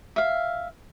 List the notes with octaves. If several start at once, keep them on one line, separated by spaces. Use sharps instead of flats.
E5 F5